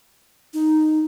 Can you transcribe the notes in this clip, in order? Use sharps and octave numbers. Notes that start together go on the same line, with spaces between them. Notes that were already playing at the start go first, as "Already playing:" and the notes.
D#4